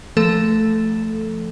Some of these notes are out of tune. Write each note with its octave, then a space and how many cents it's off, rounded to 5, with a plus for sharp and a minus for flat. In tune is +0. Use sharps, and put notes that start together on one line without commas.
F3 -20 A3 +0 A4 +0